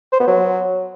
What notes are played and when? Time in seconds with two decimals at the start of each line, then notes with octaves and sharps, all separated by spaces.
0.13 C5
0.20 B3
0.28 F#3